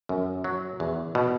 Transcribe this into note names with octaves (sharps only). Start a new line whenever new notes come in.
F#2
F#3
E2
B2